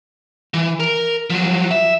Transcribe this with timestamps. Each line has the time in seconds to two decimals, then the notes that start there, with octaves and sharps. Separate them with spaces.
0.54 E3
0.80 A#4
1.30 F3 F#3
1.71 E5